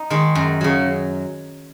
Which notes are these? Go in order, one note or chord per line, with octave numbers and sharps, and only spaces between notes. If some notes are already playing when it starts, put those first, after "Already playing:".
Already playing: D#4
D#3 G#3
F#2
C#3 F#3